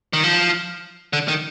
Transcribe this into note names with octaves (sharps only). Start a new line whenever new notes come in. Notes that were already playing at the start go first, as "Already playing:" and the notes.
D#3
F3
D3
D#3